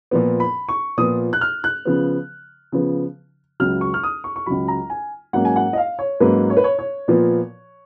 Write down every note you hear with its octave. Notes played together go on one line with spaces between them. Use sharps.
A#2 F3 B3
B5
C#6
A#2 F3 B3 D#6
F#6
F6
F#6
C#3 F3 B3
C#3 F3 B3
C#2 C#3 F#3 F6
C#6
F6
D#6
C#6
C#6
C#2 C#3 F#3 B5
A#5
G#5
G#2 F#3 A#3 C#4 F#5
G#5
F#5
D#5
F5
C#5
G#2 F#3 A#3 C#4 B4
C#5
B4
C#5
C#5
A#2 F3 B3